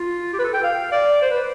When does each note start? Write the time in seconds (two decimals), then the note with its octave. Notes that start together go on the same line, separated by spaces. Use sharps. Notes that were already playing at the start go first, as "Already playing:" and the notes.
Already playing: F4
0.33 G4
0.39 B4
0.44 A4
0.54 G5
0.64 F5
0.92 D5
1.22 C5
1.31 B4